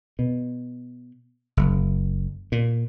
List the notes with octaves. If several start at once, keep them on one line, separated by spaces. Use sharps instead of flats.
B2
F#1
A#2